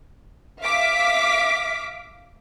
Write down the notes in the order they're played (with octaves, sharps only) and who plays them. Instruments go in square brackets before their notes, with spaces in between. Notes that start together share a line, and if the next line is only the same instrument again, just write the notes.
[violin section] E5 F5 D6 B6